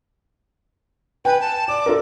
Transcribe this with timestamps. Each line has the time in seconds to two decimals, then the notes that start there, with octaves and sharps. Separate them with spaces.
1.25 B4 G5 G#5
1.40 A5
1.68 D5 D6
1.86 F4 A4 A#4